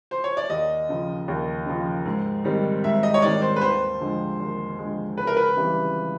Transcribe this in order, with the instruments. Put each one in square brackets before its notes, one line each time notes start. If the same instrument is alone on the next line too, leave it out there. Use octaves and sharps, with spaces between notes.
[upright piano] C5
C#5
D5
[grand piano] D#2 [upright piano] D#5
[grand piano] C#3 F3
D#2
C#3 F3
G#2
D#3 G3 C4 D#4
[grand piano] G#2 [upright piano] E5
[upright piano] D#5
C#5
[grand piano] D#3 G3 C4 D#4 [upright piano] D5
[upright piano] C5
B4
[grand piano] D#2 [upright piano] C5
[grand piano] D3 F3 G#3
D#2
D3 F3 G#3
[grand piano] C#2 [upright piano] B4
[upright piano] A#4
B4
[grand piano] C#3 E3 G3 C4